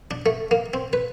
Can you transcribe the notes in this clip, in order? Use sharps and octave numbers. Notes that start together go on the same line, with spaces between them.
D4
A3
A#3
C4
B4